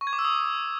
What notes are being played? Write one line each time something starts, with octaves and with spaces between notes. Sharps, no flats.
C#6
G#6
D6
E6
D#6